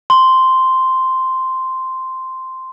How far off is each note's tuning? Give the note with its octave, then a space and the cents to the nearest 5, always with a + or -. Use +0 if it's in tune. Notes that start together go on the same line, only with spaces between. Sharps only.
C6 -5